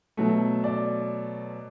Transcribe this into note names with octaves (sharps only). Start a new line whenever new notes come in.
B2 F#3 A3
D5